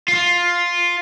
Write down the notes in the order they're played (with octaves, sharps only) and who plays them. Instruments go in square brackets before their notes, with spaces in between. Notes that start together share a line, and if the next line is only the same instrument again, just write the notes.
[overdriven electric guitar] F4